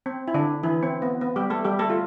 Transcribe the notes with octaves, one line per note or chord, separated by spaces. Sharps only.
C4
E4
D3 D4
E3 E4
C4
B3
B3
G3 G4
A3 A4
G3 G4
A3 A4
F4